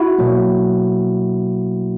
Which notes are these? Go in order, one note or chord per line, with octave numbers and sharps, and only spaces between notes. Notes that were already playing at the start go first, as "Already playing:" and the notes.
Already playing: E4 F#4
B2 F#3 A#3